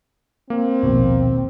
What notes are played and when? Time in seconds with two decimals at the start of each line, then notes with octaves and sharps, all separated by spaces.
0.50 A#3 C4
0.83 A#1 D#2 B2